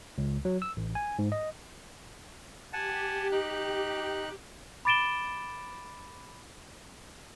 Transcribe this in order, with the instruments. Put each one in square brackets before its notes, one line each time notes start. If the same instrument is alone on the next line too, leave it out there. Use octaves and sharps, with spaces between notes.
[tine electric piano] C#2
F#3
E6
A1
G#5
G#2
D#5
[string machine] G4 [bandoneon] F#5 G#5 A5
[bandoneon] D#4 F#6
[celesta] B5 D6 A6 D7 E7 G7